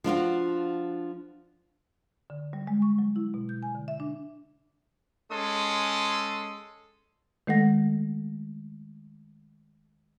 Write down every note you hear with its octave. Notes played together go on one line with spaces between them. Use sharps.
F3 D4 F4 F#4
D3
G3
G#3
C#6
F#3
E4
B2
G6
G#5
D3
E5
D4
G#3 C#4 A4 C6 D#6
D#3 G#3 A3 A4 F#5 A#6